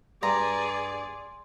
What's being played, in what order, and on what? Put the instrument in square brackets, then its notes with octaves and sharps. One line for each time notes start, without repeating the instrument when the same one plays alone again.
[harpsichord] G2 [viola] G#4 D5 [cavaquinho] A#5 [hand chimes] C6